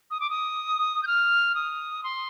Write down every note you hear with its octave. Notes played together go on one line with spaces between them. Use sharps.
D#6
D6
D#6
G6
F6
D#6
C6